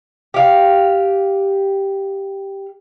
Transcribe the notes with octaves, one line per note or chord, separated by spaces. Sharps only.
G4 F5